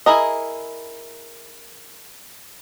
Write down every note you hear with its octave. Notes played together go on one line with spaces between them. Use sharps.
E4 G#4 A#4 D#5